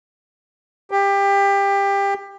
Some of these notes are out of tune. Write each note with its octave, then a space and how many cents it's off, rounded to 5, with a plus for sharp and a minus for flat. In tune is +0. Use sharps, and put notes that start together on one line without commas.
G4 +20